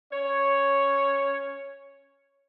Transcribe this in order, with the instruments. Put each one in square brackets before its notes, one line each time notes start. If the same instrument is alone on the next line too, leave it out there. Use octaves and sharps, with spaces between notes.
[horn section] C#4 C#5